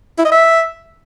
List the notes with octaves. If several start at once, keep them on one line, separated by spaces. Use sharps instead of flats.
E4
D#5
E5